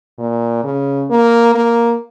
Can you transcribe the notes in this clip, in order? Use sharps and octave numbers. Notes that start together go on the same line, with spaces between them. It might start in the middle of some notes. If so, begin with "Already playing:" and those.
A#2
C#3
A#3
A#3